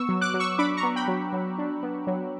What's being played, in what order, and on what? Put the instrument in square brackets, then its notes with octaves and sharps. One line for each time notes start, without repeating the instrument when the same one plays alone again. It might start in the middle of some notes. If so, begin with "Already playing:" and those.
Already playing: [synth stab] B3 C#6 E6
F#3
D6 F#6
F#3
C#6 E6
D4 B5 D6
A#5 C#6
B3
G5 B5
F#3
F#3
D4
B3
F#3